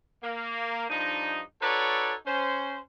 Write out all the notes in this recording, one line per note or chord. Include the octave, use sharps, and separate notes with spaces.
A#3
G2 F3 D4 D#4
D#4 F#4 A4 B4 C#5 D5
C#4 C5